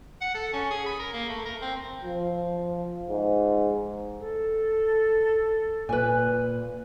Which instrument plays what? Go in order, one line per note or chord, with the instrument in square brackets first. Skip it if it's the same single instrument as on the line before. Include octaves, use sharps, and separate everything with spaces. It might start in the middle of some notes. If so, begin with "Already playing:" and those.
[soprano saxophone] F#5
A4
C#4
G#4
B5
A#4
A#3
A3
A#4
C4
[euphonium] F3
G#2
[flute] A4
[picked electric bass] A#2 [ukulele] B4 G#5